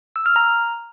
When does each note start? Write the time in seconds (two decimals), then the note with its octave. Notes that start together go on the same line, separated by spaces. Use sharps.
0.16 E6
0.26 F6
0.36 A#5